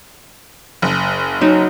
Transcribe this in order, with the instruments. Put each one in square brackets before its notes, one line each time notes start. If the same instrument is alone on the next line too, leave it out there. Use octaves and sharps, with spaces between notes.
[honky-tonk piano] F#1
[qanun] F#3 D#4